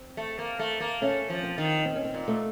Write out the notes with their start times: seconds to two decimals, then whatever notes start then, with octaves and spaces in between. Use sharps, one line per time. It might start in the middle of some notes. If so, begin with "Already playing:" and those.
Already playing: C4
0.17 A3
0.39 A#3
0.59 A3
0.80 A#3
1.02 A3 C#4
1.30 F3
1.43 C4
1.58 D#3
1.85 C4
1.95 C#4
2.05 C4
2.14 A#2
2.28 A3